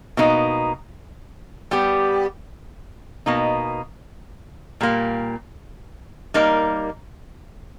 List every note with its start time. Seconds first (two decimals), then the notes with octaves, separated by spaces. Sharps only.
0.17 B2 A#3 D#4
1.71 G3 B3 G4
3.26 B2 A#3 D#4
4.81 A#2 G3 A#3
6.34 G3 A#3 D#4 A#4